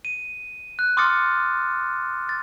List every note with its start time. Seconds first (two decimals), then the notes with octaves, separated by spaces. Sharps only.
0.05 D#7
0.79 F#6
0.97 C6 D6 D#6 F6 A6 C#7
2.29 A6